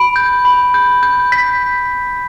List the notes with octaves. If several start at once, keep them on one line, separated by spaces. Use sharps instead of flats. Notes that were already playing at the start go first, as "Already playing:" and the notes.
Already playing: B5 D7
G6
B5
G6
G6
G6 B6